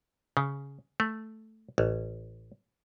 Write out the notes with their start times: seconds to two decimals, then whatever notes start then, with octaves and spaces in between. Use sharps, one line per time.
0.37 C#3
1.00 A3
1.78 A1